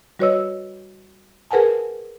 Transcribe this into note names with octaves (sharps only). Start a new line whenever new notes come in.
G3 F#4 B4 C#5 D#5 E6
G#4 A#4 B4 F#5 G#5 A5